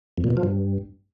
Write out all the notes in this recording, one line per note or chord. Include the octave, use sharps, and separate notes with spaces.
F2
A#2
B2
F3
G2